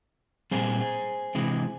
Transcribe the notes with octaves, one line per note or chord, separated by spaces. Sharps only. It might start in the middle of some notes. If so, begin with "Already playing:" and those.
A#2 G3 C4 G#4 C5
C3 E3 G#3